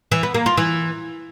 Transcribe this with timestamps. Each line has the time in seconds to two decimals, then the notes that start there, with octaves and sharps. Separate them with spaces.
0.12 E3
0.23 B3
0.34 A#3
0.46 F4
0.57 E3